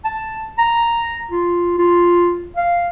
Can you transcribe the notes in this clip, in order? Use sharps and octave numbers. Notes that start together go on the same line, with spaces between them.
A5
A#5
F4
F4
F5